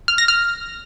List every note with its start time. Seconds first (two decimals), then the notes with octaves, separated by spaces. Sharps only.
0.08 F6
0.18 A#6
0.28 F6